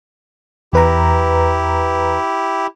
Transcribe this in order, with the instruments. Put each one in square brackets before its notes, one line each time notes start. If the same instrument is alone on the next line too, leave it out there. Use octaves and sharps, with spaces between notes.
[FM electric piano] E2 B4 A#5 [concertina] E4 G4